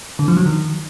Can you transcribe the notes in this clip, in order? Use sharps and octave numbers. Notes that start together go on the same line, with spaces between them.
D3
F3
F#3
D#3